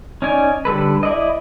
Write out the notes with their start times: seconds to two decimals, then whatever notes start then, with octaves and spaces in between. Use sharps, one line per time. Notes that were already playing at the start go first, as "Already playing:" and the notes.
0.22 C#4 D#4 D5 G#5
0.65 D3 G3 A4 B4
1.03 E4 D5 D#5